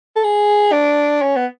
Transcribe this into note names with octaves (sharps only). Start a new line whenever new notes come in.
A4
G#4
D4
C#4
B3